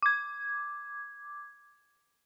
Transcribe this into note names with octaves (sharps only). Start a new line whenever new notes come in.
D6 G#6